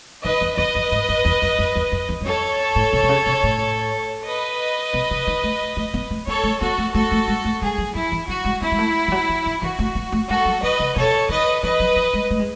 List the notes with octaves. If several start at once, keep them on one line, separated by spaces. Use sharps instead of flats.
D#3 B4 D#5
E2
E2 B4 D#5
F#2
G#2
F#2
E2
F#2
F#2
E2
F#2
E2
G#2
F#2 A4 C#5
A2
B2
B2
C#3
B2
A2
B4 D#5
B2
C#3
D#3
A3
A3
B3
A3
B3 A4 C#5
A3
B3 F#4 A4
A3
A3 F#4 A4
A3
G#3
A3
G#3 G#4
F#3
F#3 E4
E3
F#3 F#4
G#3
B3 E4
G#3
A3
E3
F#3
E3
D#3
E3 F#4
A3
B3
A3
G#3 F#4 A4
F#3
D#3 B4 D#5
C#3
B2 A4 C#5
D#3 B4 D#5
E3 B4 D#5
F#3
E3
G#3
A3
G#3